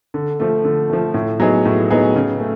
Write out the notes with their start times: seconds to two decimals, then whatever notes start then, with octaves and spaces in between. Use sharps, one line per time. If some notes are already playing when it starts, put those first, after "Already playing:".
0.14 D3
0.40 F3 A3
0.64 D3
0.90 F3 A3
1.14 A2
1.40 F#3 B3 D#4 G#4
1.65 A2
1.91 F#3 B3 D#4 G#4
2.15 C#3
2.39 A3